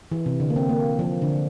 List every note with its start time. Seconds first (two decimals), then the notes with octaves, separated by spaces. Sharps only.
0.12 E3
0.26 C3
0.40 D3
0.50 A#3
0.56 C4
0.69 A#3
0.99 F3
1.22 D3